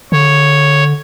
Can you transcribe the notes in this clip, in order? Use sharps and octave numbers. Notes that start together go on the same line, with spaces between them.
D3 C#5